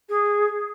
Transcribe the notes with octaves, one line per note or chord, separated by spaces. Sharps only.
G#4